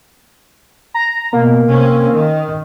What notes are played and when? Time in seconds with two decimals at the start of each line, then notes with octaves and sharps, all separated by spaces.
0.94 A#5
1.33 B2 A#3
1.68 C3 C4 C#4
2.12 D#3